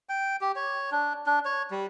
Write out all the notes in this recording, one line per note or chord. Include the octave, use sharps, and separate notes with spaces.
G5
G4
C#5
D4
D4
C#5
G3